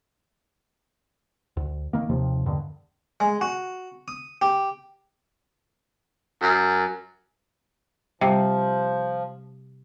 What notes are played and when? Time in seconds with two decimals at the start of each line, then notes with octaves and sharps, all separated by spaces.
1.57 D2
1.93 D#3 A#3
2.09 D#2 C3 F3
2.46 E2 G2 D3 D#3
3.20 G#3
3.41 F#4
4.08 D#6
4.42 G4
6.42 F#2
8.21 C3 F3 G3